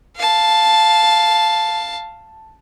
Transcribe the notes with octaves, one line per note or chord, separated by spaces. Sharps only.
F5 A5